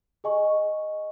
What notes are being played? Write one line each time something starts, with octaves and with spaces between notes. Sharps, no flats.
G#4 D#5 G#5 C#6